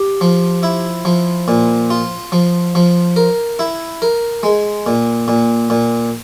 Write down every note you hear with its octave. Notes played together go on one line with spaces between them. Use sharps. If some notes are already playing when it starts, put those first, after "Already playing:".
Already playing: G4
F3
E4
F3
A#2
F4
F3
F3
A#4
E4
A#4
G#3
A#2
A#2
A#2